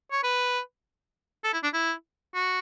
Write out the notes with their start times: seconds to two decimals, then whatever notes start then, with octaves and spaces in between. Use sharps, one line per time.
0.12 C#5
0.23 B4
1.44 A4
1.53 E4
1.63 D4
1.73 E4
2.34 F#4